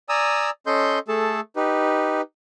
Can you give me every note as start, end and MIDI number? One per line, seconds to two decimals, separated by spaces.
0.09 0.50 74
0.09 0.50 80
0.09 0.50 82
0.09 0.50 87
0.09 0.50 88
0.67 0.99 61
0.67 0.99 69
0.67 0.99 75
0.67 0.99 84
0.67 0.99 91
1.08 1.40 57
1.08 1.40 68
1.08 1.40 69
1.08 1.40 81
1.56 2.21 63
1.56 2.21 67
1.56 2.21 71